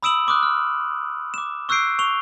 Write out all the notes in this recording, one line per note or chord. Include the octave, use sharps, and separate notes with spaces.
B5 D#6 E6 D7 E7 F#7
C6 D6 D#6 F6 F#6
F6
D6 E7
C#6 E6 F#6 G6 C7 D7
C#6 F7 G7